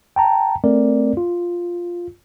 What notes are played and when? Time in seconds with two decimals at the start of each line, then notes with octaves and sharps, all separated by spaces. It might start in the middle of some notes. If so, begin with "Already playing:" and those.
0.16 G5 A5 A#5
0.64 A3 C4 A#4 D5
1.17 F4